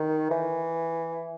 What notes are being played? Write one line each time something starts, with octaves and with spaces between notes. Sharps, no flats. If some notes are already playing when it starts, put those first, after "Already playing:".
Already playing: D#3
E3